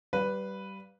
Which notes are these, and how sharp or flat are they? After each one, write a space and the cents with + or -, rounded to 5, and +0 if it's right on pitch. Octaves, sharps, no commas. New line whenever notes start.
G3 -20 B4 +0 F5 +0